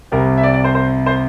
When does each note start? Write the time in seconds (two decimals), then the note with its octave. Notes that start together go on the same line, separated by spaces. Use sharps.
0.12 C2 C3 G3 C4 A#4
0.38 E5
0.43 D5
0.54 D5
0.64 C5
0.75 C5
1.06 C5